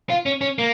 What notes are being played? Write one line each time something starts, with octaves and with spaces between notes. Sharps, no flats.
F4
C#4
C#4
A#3